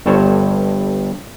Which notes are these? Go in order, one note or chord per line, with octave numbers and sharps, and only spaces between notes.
G1 G2 A4 C5 C#5